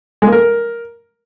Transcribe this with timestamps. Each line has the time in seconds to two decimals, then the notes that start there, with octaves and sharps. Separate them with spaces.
0.22 G#3
0.27 A#3
0.32 A#4